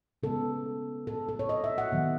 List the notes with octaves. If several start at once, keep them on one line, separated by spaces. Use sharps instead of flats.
C#3 G#3 B3 A4
A4
A4
C#5
D#5
E5
F#5
D#3 F#3 B3